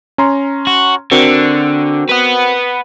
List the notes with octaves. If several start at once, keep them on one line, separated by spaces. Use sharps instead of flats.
C#4 A#5 C6
F#4
D3 C4 F#4 A#4
B4 F#5